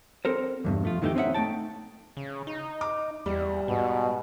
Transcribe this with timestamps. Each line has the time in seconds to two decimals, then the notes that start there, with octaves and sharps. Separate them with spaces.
0.25 C4 A4 A#4 C5
0.65 E2 G2 B2
0.83 F2 A3 F4
1.02 D#3 E3 A3 D#4 G4
1.15 C4 C#4 D#4 F#4 E5 F#5
1.35 A3 A#3 D#4 G5 A5
2.17 C#3
2.47 D#4
2.81 D6
3.26 E2 G3
3.68 G#2 B2